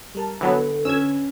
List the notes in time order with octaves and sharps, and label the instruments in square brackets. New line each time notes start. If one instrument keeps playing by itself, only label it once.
[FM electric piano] G3 A#4 A5
[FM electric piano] D3 B4 [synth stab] E3 F#3 B3 [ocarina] A4
[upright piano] C#4 [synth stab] E6 G#6